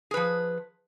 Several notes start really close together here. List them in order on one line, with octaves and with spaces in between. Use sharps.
G#4 B4 F3